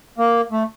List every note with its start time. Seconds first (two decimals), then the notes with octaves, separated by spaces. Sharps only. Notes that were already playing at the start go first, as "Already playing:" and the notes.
0.18 A#3
0.52 A3